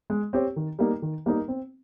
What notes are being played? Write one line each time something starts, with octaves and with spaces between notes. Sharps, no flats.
G#3
C4 G4 C#5
D#3
G3 A#3 D#4 A#4
D#3
G3 A#3 D#4 A#4
C4